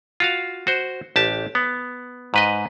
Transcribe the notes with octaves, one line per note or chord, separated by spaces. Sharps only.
F4 F#4 F5
F#4 C5
A1 G4 A5
B3
G#2 B4 D#5